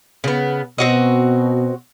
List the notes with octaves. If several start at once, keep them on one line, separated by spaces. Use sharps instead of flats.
C#3 B3
B2 C4 F#4 D#5